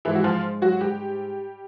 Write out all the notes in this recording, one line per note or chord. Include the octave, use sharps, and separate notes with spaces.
G#2 E3 F3 E4
F#4
F3 F4
F#3 F#4
G3 G4